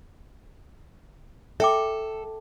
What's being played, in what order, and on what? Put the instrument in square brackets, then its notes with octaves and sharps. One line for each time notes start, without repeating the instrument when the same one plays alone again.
[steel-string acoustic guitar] A4 [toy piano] E5 G5 D6